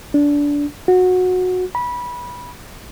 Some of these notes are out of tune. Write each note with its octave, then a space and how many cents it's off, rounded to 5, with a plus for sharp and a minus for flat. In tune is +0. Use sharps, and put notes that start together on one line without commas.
D4 -20
F#4 -15
B5 -20